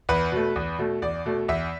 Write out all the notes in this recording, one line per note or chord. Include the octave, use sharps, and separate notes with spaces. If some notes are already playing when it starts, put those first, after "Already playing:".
E2 B4
B2 A3
E2
B2 A3
E2 D5
B2 A3
E2 E5